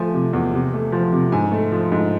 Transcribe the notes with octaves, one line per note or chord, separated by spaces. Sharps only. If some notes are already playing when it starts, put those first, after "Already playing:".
Already playing: F3 A3 G#5
C3
E2
C3
A3
F3
C3
G#2 G#5
A3
F3
G#2